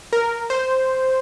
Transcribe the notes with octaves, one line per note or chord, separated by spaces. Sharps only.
A#4
C5